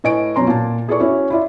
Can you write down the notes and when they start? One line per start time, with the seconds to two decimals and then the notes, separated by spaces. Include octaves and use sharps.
0.04 A2 B4 D#5 G#5 C#6 D7
0.36 B2 F#3 C#4 A#5 C6
0.47 A#2 A5
0.88 E4 G#4 A4 B4 D5 C#6
1.00 C#4 E4 F#4
1.30 E4 F4 D5 E5